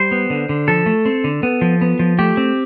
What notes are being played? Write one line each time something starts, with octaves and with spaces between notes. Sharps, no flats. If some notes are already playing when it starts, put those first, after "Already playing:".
Already playing: G3 C5
B3
D3
D3
F3 A4
A3
C4
D3
B3
F3
B3
F3
A3 G4
C4